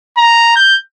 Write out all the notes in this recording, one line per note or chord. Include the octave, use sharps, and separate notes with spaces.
A#5
G6